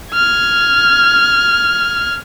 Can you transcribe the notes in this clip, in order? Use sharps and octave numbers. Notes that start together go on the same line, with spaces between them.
F6 G#6